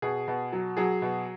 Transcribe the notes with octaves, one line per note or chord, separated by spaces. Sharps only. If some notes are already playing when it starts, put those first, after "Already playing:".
B2 G#4
B2
F#3
F#3 G#4
B2